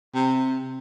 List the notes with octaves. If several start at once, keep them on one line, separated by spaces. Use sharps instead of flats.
C3